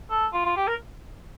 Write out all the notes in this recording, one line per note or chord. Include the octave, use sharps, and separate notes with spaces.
A4
F4
F4
G4
A#4